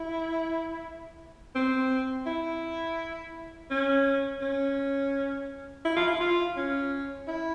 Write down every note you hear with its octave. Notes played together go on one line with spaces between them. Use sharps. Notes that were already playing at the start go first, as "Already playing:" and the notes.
Already playing: E4
C4
E4
C#4
C#4
E4
F4
E4
F4
C#4
E4